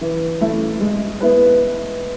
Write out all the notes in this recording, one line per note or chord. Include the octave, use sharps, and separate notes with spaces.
E3
A3 E4
G#3
B3 E4 B4